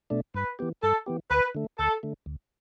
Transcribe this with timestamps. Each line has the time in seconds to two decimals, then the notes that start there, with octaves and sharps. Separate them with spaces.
0.10 B2 A3 D4
0.34 G2 B4
0.59 E3 B3 G4
0.82 G2 A4
1.06 E3 B3 G4
1.31 D2 B4
1.55 D3 A3
1.79 D2 A4
2.03 D3 A3
2.26 D2